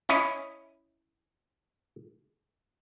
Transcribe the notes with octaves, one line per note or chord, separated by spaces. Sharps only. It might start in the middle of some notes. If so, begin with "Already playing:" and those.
C#4 E4 C#5 D#5